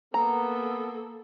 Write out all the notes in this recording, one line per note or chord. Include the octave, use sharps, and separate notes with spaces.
A#3 B3 A4 A#5